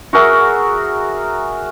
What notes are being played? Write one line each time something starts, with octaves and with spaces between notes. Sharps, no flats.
F#4 G#4 A#4 E5